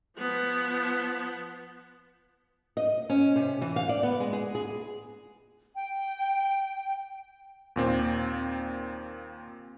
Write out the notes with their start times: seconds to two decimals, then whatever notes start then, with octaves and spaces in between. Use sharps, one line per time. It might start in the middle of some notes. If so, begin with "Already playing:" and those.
0.18 F3 B3
2.77 D#5
3.10 C#4
3.36 C3
3.61 E3
3.76 F5
3.89 D5
4.03 B3
4.20 G#3
4.33 G#4
4.55 G#4
5.75 G5
7.76 D#2 A#2 C4